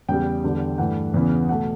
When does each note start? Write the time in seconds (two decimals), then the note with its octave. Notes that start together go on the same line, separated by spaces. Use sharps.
0.09 E2 C#3 G3 G5
0.44 E2 D3 G3
0.78 G2 E3 A3 F#5
1.14 E2 C#3 E3 B3
1.49 B2 A3 F#5